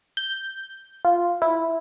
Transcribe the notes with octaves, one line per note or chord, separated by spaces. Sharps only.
G6
F4
E4